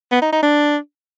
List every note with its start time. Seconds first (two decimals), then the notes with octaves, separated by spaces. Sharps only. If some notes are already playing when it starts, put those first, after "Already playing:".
0.12 B3
0.22 D#4
0.32 D#4
0.43 D4